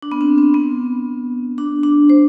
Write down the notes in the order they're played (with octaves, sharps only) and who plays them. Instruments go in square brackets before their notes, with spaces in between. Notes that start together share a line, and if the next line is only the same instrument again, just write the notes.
[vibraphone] D4
B3
C4
C4
B3
D4
D4
C5